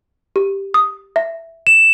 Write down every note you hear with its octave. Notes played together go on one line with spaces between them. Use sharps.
G4
D#6
E5
E7